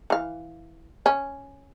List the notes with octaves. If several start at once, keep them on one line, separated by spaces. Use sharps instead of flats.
E3 F5
C#4